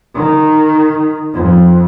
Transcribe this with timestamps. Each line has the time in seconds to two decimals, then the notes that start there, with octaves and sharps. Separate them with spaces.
0.15 D#3
1.34 F2